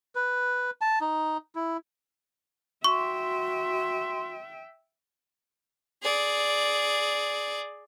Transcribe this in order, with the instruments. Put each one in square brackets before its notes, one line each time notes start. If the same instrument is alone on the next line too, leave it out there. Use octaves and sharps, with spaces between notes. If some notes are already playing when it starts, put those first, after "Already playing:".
[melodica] B4
A5
D#4
E4
[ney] F#4 [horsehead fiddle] E5 G5 [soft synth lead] C6 [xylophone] C#6
[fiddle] G#4 D5